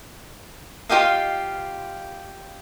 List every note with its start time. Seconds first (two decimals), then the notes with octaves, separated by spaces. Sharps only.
0.89 F4 G4 D#5 F5